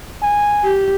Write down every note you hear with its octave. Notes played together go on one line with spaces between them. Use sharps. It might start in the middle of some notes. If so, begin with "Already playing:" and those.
G#5
G4